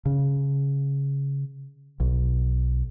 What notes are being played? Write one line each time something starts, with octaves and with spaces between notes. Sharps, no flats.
C#3
B1